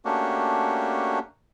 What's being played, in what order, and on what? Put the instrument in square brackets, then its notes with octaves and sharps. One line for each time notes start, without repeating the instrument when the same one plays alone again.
[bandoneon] A3 A#3 C#4 D4 F#4 G4